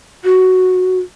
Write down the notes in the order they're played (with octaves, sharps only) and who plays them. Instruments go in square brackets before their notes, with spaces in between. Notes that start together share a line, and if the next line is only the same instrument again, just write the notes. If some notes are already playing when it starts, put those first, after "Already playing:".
[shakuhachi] F#4